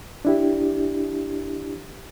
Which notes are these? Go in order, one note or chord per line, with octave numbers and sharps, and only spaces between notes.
D4 E4 G4